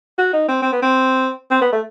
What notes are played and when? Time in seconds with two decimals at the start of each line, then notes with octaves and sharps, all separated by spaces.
0.19 F#4
0.33 D#4
0.48 C4
0.62 C4
0.72 B3
0.82 C4
1.50 C4
1.61 B3
1.73 A3